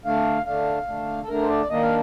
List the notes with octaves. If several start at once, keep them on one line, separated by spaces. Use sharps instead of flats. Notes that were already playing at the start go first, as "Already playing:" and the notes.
D3 A3 D4 F5
D3 A3 D4 F5
D3 A3 D4
A4
D3 A3 D4 A#4
C5
D5
D#3 A#3 D4 D#5
F5